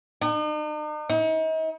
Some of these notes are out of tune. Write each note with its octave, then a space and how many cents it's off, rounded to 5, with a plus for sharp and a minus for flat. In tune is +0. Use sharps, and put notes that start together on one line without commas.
D#4 -45
D#4 +40